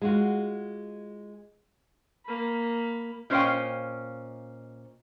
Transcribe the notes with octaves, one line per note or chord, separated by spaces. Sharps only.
G#3 F4 F#4
A#3 B5
A#2 C#4 C5 D#5 F5 G5